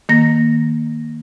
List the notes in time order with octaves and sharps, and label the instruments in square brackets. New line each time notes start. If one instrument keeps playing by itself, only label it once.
[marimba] D#3 A#3 A#6